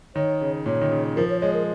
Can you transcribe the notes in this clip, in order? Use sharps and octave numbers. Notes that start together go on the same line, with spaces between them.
D#3 C#5
C#3
A#2 C#5
D#3
C#3
F3 A#4
C#5
G#3 C#5
A#4